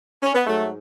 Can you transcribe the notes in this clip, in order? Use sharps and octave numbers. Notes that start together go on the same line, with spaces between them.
C#4
B3
G#2 F#3 A3